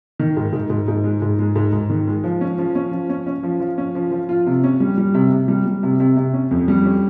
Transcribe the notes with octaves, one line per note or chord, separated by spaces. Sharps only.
D#3
G#2
G#2
G#2
G#2
G#3
G#2
G#3
G#2
G#2
D#3
G#3
F3
C#4
F3
C#4
F3
C#4
C#4
F3
F3
C#4
F3
F3
F4
C3
C#4
G3
G3
C3
C3
G3
G3
C3
C3
C3
C#4
F2
G3
C#4